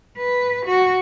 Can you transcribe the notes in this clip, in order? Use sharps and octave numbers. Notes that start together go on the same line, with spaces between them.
B4
F#4